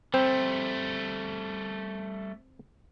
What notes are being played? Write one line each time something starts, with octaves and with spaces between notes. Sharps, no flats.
G3 A3 C4 C5